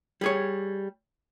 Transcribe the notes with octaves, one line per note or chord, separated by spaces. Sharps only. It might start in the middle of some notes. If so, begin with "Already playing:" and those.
G3 G#4 C#5